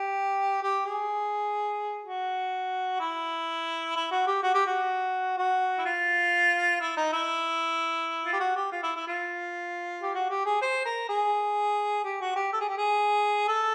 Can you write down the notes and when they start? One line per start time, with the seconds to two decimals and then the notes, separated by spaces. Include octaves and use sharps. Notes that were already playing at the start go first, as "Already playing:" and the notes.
Already playing: G4
0.62 G4
0.85 G#4
2.04 F#4
3.00 E4
3.96 E4
4.11 F#4
4.27 G4
4.42 F#4
4.54 G4
4.67 F#4
5.37 F#4
5.78 E4
5.86 F4
6.81 E4
6.97 D#4
7.13 E4
8.24 F4
8.33 G4
8.40 F#4
8.56 G4
8.72 F4
8.83 E4
8.96 E4
9.07 F4
10.02 G4
10.15 F#4
10.30 G4
10.46 G#4
10.61 C5
10.85 A#4
11.09 G#4
12.04 G4
12.21 F#4
12.36 G4
12.53 A4
12.61 G#4
12.69 G4
12.77 G#4
13.48 A4